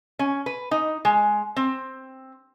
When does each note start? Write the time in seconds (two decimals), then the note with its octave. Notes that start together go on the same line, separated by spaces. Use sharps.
0.19 C#4
0.46 B4
0.71 D#4
1.05 G#3
1.56 C4